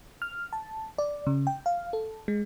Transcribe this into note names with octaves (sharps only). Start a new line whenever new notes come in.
F6
A5
D5
C#3
G5
F5
A4
G#3